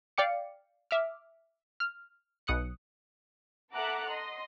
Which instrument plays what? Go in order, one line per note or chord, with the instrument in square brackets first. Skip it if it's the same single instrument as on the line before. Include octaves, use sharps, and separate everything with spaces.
[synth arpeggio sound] D5 F5 G5 D6 C#7
E5 D6 F6
F6
B1 D#6 F#6 C#7
[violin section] A4 E5 F#5 A#5 D6 F#6
D#5 C6